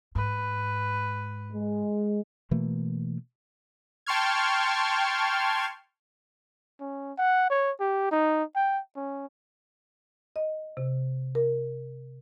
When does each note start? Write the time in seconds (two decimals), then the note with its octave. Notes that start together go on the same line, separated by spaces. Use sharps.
0.15 G#2 B4
1.51 G#3
2.51 B2 E3 A3 A#3
4.06 G5 A5 C6 C#6 F6 G#6
6.80 C#4
7.18 F#5
7.50 C#5
7.80 G4
8.11 D#4
8.56 G5
8.96 C#4
10.36 D#5
10.77 C3
11.35 A#4